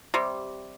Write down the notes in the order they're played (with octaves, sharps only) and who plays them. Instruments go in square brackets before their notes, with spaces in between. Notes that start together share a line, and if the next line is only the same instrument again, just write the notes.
[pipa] C3 G3